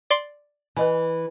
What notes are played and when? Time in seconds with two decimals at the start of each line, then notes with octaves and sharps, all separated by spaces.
0.10 D5 C6
0.77 E3 B4 D#5 G#5